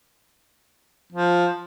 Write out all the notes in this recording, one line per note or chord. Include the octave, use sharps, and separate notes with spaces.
F3